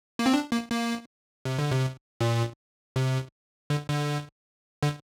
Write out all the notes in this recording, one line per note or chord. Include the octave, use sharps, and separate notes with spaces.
A#3
C4
D4
A#3
A#3
C3
D3
C3
A#2
C3
D3
D3
D3